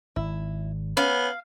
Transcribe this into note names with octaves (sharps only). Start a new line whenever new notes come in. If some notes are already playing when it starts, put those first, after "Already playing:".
G#1 E4
B3 C#4 F5